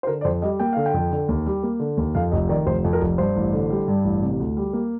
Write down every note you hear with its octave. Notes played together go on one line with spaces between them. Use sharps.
C5
D3 A#4
D5
F2 C5
G3 D#5
A#3 G5
D3 F5
G5
F2
D3
D#2
G3
A#3
D3
D#2
F2 F5
F1 D#5
D#3 D5
F1 C5
F2
A#4
F1
G2 C5
A1
D3
G3
G2
A1
C3
D2
G3
A#3